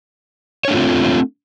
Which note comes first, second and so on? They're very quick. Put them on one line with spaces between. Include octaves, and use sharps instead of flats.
C#5 D4 A3 F4 C4